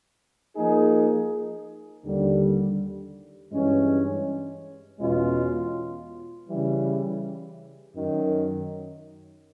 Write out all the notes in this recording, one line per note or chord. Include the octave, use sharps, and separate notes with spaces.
F3 A#3 D#4 G#4
D#2 D3 G3
G2 E3 G#3 C#4
E2 B2 G#3 C#4 F4
C#3 E3 G3
F#2 D#3 F#3